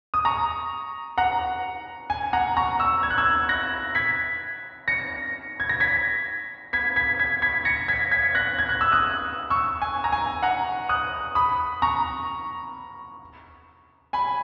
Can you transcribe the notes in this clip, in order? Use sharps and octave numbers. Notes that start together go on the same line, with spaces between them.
D#6
A#5 C#6
F#5 A#5
G#5
F#5 A#5
A#5 C#6
C#6 E6
G#6
F#6
E6 G#6
F#6 A#6
G#6 B6
A#6 C#7
G#6
A#6
G#6 B6
G#6 B6
G#6 B6
G#6 B6
G#6 B6
A#6 C#7
G#6 B6
G#6 B6
F#6 A#6
G#6
F#6
E6
D#6 F#6
C#6 E6
G#5
A#5
G#5
F#5 A#5
D#6 F#6
B5 D#6
A#5 C#6
G#5 B5